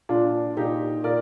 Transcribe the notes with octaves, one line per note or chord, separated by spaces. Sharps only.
A#2 D4 F4
A#2 D#4 G4
A#2 A#4 D5